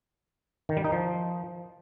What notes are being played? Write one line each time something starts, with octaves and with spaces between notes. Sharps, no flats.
D#3
G3
D#4
F3